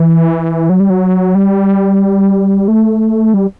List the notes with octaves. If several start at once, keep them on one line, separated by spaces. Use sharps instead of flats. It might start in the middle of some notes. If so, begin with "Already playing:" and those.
Already playing: E3
F#3
G3
F#3
G3
A3
G3